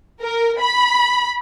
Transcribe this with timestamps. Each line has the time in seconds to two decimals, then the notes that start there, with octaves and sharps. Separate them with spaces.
0.20 A#4
0.59 B5